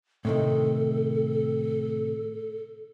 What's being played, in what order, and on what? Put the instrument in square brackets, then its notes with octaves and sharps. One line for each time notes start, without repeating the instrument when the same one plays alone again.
[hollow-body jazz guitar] A2 C3 D#3 [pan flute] A4